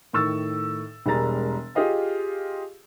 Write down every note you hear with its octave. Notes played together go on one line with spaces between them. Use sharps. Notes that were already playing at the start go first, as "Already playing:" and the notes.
A2 D#3 C#6 E6 A6
E1 G3 G#3 A#4 A#5 A6
F4 G4 G#4 D#5 F5